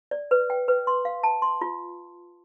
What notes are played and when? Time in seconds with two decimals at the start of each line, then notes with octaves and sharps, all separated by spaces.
0.11 D5
0.31 B4
0.50 G5
0.68 B4
0.87 C6
1.05 F5
1.23 A5
1.42 C6
1.61 F4